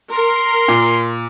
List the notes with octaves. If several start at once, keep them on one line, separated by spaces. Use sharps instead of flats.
A#4 C6
A#2